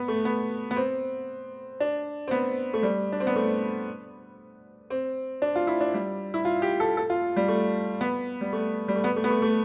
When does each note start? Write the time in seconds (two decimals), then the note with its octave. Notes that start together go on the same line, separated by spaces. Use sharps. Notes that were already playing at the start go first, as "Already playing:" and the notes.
Already playing: B3
0.08 A3
0.25 B3
0.71 B3
0.76 C4
1.80 D4
2.28 C4
2.31 B3
2.74 A3
2.83 G3
3.13 D4
3.20 C4
3.27 B3
3.36 A3
4.90 C4
5.42 D4
5.56 F4
5.67 E4
5.81 D4
5.94 G3
6.34 E4
6.45 F4
6.62 G4
6.80 A4
6.97 A4
7.10 F4
7.37 G3
7.48 A3
8.01 B3
8.41 G3
8.53 A3
8.88 G3
8.96 A3
9.04 B3
9.16 A3
9.24 B3
9.30 A3
9.42 A3